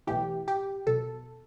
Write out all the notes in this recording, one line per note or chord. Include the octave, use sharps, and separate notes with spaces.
B1 A2 E3 G4
G4
B1 B2 A4